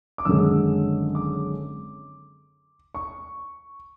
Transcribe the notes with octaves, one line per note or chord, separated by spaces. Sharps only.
D6
G#1 F#2 D3 G#3 E6
D6
C#6